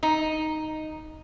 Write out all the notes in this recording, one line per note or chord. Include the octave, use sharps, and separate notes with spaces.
D#4